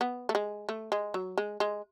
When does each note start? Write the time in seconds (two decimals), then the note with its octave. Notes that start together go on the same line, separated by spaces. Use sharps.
0.01 B3
0.29 A3
0.35 G#3
0.69 A3
0.92 G#3
1.14 F#3
1.38 G#3
1.60 G#3